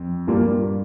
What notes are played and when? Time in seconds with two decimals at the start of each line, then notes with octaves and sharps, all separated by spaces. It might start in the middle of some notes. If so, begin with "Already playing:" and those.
Already playing: F2
0.27 G2 A#2 G3 A#3